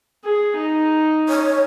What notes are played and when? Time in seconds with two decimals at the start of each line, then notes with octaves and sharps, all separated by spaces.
0.24 G#4
0.56 D#4
1.29 C#5